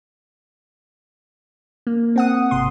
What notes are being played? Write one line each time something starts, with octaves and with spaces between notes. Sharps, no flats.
A#3
C4 F#5 D#6
G#1 C3 C6